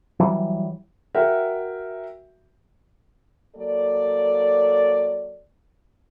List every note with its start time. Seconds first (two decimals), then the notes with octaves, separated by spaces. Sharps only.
0.20 E3 F#3 G3
1.15 F#4 A#4 E5 F#5 G5
3.55 F#3 A#3 A4 D5